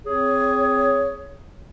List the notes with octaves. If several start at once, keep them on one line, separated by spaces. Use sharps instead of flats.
C4 G#4 C#5